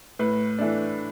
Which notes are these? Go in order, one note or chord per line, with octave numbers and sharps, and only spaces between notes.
A2 B4
E3 A3 D4